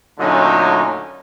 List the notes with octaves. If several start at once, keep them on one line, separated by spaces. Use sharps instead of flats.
A#2 D3 F#3 A3 C#4 D#4